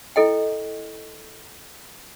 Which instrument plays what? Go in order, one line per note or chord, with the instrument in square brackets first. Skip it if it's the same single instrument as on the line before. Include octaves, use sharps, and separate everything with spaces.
[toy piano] E4 A4 D#5 G5